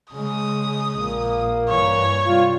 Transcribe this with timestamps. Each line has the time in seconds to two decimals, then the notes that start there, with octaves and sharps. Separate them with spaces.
0.13 C#3 G#3 D#6
0.99 A#1 A#3
1.69 G2 E3 C#5
2.26 C3 G3 F4